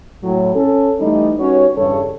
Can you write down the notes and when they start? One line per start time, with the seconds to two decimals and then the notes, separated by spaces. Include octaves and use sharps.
0.23 A2 F#3
0.54 C#4 A4
1.00 E3 G3 A3 D#4
1.39 G3 B3 C#4 D#4 F#4 C#5
1.77 E2 G2 C#3 G3 A4 C#5